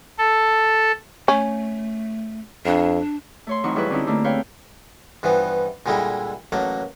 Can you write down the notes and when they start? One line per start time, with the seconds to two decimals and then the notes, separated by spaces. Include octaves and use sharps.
0.18 A4
1.28 A3 C#4
2.66 F2 D4
3.47 A3 C#5 C6
3.64 F2 E3 F#3 D#4 C#6
3.75 F#3 G3 E4 G#4 B4
3.89 D3 C4 C#4 D#4 E4
4.07 D3 A3 A#3
4.24 B4 C#5 F5 G5
5.23 G2 E3 F3 B3
5.86 A#2 D3 G3 G#3 D#4 E4
6.52 A1 F#3 A#3 A5